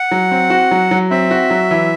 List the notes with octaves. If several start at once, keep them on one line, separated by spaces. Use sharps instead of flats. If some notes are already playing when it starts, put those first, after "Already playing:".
Already playing: F#5
F#3
C4
F#4
F#3
F#3
C4 E5
F#4
F#3
E3